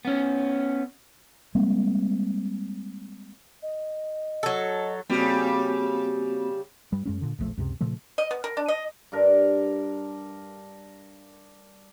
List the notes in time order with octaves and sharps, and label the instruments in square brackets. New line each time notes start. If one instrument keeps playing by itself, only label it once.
[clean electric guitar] B3 C#4
[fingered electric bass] G3 G#3 A#3 C4
[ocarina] D#5
[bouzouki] F#3 A4
[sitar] C#3 G3 [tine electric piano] A#3 C4 F#4
[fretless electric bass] G2 G3
F#2 G#3 C#4
A#2 D3
E1 A#1 F3 A3
C#2 F#2 C3
A#2 C#3 F3 A3
[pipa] D#5
B3
A#4
D4
D#5
[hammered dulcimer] G2 D4 A#4